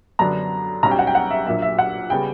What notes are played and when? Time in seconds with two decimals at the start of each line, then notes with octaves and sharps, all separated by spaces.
0.19 F#2 D3 F#3 B3 D4 A#5
0.83 B1 B2 G3 C#4 A#5
0.91 G5
0.99 F#5
1.07 G5
1.15 F#5
1.31 E5
1.46 A#1 A#2 F#3 A#3 E5
1.62 E5
1.78 F#5
2.10 C#3 G3 B3 G5